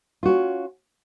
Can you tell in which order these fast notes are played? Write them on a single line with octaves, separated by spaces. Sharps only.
F4 F#4 C#4